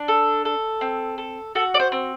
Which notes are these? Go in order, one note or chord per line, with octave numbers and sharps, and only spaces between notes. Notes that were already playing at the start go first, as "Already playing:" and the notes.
Already playing: D4
A4
A4
C4
A4
F#4 A4
D5
C5
C4